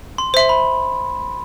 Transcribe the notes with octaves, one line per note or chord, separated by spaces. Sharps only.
C6
C5 E5 C6
B5